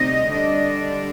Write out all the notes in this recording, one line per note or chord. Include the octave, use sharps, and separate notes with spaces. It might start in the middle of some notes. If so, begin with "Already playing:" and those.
Already playing: D2 C3 G3 C4 D#4 D#5
D3 G3 D4